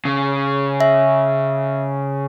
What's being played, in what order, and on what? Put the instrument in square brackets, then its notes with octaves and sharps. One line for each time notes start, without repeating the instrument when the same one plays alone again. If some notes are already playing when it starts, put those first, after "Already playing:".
[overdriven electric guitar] C#3
[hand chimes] E5